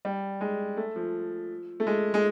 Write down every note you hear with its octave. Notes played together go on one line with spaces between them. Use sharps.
G3
G#3
A3
F3
A3
G#3
G#3